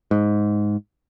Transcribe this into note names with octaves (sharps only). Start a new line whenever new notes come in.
G#2